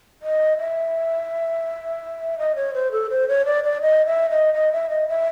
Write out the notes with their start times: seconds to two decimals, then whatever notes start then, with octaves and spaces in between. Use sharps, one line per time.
0.22 D#5
0.58 E5
2.38 D#5
2.56 C#5
2.74 C5
2.92 A4
3.10 C5
3.28 C#5
3.46 D5
3.64 D5
3.82 D#5
4.06 E5
4.30 D#5
4.54 D#5
4.73 E5
4.89 D#5
5.08 E5